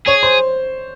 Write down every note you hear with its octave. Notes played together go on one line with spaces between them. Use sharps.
G#4 C#5
C5